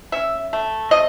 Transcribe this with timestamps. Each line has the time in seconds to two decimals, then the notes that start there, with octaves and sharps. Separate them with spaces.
0.12 C#4 E5
0.53 A3
0.91 C3 D#5